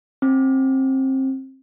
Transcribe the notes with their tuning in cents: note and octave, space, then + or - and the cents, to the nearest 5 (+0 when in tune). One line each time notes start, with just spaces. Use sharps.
C4 +25